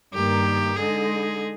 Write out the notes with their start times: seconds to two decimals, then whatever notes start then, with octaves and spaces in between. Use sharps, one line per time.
0.14 G2 D#3 A#3 G4
0.76 D3 G#3 D#4 G#4